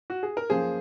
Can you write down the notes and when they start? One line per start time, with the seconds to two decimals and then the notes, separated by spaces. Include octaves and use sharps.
0.10 F#4
0.23 G#4
0.37 A#4
0.50 F#2 F3 A#3 G#4 C5